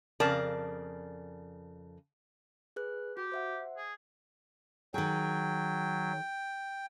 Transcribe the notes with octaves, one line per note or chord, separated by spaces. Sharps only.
F2 C#3 A#4 D5 A5
G#4 B4 F#6
F#4 G4
C5 E5 F#5
G#4
D#3 F#3 G#4 G5